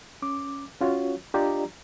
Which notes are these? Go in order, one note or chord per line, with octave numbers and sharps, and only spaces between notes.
C#4 D6
C#4 F4 F#4 C#5
D4 F4 G4 D5 D#5 A#5